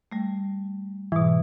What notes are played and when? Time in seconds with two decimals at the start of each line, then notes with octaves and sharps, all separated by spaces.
0.12 G3 A3
1.12 G#2 B2 E3